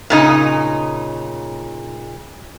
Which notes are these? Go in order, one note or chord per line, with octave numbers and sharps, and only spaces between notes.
A#2 C#3 D#4